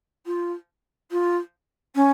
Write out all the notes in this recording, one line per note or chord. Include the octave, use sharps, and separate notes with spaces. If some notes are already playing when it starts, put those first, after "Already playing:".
F4
F4
C#4